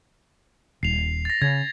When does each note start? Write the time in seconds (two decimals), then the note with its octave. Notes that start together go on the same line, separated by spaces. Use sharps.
0.83 D#1 C7 F7
1.25 A6 A#6
1.42 C#3 G#6 A#6